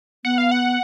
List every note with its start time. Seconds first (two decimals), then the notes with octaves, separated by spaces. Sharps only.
0.24 B3 F#5
0.38 F5
0.51 F#5